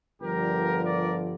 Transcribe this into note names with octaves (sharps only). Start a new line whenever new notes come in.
G1 G2 D3 F3 G4 A#4
A#4 D5